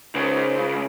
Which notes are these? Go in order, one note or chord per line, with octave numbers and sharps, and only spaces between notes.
C#2 C#3 D#4 A#4 C5